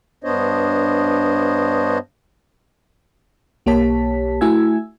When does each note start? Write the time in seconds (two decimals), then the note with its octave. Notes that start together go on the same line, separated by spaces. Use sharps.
0.24 G2 B3 D4 C5 C#5 D#5
3.66 B1 A#3 G4 C#5 A5 B6
4.41 A3 E4 F#4 G#5 E6 G#6